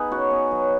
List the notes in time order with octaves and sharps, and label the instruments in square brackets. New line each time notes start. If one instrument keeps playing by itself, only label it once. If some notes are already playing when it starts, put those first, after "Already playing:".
Already playing: [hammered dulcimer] B3 D#4 G#4 B4
C#3 F#4
B3
F#3